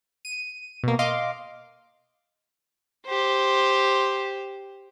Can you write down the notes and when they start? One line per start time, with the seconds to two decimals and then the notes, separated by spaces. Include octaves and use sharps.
0.25 D#7
0.83 B2 A#3
0.99 D#5 F5 C6 D6
3.07 G4 C5